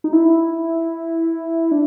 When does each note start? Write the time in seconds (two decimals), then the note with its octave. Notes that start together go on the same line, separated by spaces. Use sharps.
0.04 D#4
0.13 E4
1.72 D4